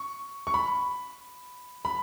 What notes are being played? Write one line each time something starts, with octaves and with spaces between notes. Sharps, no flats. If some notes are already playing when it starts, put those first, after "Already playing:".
Already playing: C#6
C#6
B5
B5